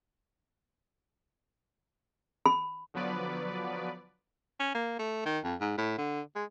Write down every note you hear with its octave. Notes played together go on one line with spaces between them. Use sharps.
B5
D3 F3 F#3 B3 B4 D5
C#4
A#3
A3
D#3
F2
G#2
A2
D3
G#3